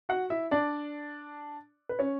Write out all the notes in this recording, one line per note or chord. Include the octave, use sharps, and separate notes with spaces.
F#4 F#5
E4 E5
D4 D5
B4
C#4 C#5